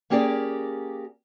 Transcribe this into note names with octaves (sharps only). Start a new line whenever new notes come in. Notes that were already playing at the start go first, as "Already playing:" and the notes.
A#3 C#4 G4 G#4 A#4 D5